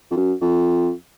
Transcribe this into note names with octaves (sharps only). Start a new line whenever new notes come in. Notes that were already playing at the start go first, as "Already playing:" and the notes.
F2
F#2
F2